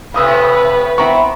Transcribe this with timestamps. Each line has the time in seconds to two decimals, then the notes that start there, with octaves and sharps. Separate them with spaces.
0.14 A2 C3 B4 F5 D#6 E6
0.98 B3 C4 E4 A#5 C#6